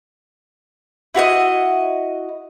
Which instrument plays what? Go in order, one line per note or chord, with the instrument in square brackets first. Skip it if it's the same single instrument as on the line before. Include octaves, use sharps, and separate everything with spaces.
[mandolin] E4 F#4 C#5 D#5